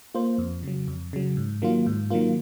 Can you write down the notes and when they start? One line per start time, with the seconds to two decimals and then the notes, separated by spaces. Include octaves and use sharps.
0.14 A#3 F4 C5
0.38 F2
0.63 C#3 F#3
0.88 F2
1.13 C#3 F#3
1.37 G#2
1.62 D#3 F#3 A#3 F4
1.86 G#2
2.10 D#3 F#3 A#3 F4